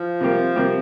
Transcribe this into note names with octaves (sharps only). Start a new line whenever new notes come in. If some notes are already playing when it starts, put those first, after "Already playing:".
Already playing: F3
C3 G3 A#3 G4
C3 G3 A#3 G4